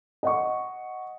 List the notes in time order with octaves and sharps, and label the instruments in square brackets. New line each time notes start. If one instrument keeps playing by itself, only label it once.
[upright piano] D#5 F#5 C#6